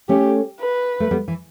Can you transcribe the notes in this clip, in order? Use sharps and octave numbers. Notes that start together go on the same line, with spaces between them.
A3 C#4 G4
B4
A3
G3 B3
E3